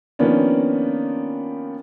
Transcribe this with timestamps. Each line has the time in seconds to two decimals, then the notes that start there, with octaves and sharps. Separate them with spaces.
0.19 D#3 F3 A#3 B3 C#4 D4